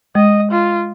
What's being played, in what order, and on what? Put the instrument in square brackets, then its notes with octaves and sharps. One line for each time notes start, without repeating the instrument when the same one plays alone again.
[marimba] G#3 [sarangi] D#5
[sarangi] F4